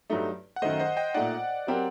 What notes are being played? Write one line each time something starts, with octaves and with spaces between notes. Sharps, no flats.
G2 F#3 A3 D#4
F#5
F#2 D#3 A3 C5 D#5
C5 D#5
D#5 G5
A#2 A3 D#4 D5 F#5
F#3 C4 G4 A#4